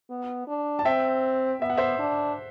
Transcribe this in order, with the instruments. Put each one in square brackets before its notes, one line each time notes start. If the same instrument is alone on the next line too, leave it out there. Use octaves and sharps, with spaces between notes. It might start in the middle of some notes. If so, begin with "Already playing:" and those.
[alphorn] B3
D4
[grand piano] A5
[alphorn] C4 [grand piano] E5 G5
[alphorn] B3 [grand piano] E5
[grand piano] F#5
C5 E5
[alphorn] D4